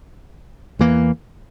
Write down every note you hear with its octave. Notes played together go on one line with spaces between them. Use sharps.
E2 E3 A#3